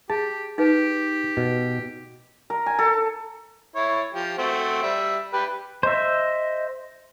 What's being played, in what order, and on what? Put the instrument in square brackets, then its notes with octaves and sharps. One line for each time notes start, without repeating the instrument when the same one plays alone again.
[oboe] G4 [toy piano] G#4 [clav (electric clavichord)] A5
[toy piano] D#4 B4 [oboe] G4
[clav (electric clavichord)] B2
[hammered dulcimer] A#4
G#5
A4
[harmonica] E4 C#5
F3 G4
A3 C4 F#4
G3 E5
G4 B4
[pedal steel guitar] C5 E5 [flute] D#5